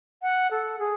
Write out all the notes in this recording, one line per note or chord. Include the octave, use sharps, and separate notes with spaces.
F#5
A4
G#4